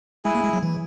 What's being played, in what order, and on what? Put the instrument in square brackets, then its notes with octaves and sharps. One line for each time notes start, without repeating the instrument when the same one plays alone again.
[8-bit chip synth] G#3 [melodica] E4 G#4
[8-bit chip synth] A#3
G#3
F#3
E3